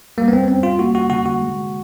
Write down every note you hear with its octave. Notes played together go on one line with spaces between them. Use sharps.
G3 A#3
B3
C4
C4 C#4
F4
A#3 F#4
F#4
D3 F#4
F#4
G#3